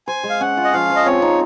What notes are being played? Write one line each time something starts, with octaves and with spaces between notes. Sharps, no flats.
C5 G#5
G#3
F5
C#4 F#5
F4
D#5
F3 F5
F3
D#5
C4 C#5
D#4